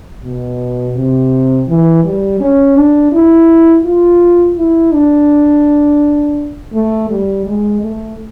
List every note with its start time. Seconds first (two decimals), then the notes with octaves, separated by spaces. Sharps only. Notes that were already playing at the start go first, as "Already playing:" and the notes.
0.23 B2
0.95 C3
1.68 E3
2.04 G3
2.40 C#4
2.76 D4
3.12 E4
3.84 F4
4.57 E4
4.93 D4
6.73 A3
7.10 G3
7.46 G#3
7.81 A3